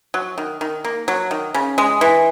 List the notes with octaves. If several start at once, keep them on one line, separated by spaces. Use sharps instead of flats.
F#3
D#3
D#3
A#3
F#3
D#3
C#3
G#3
E3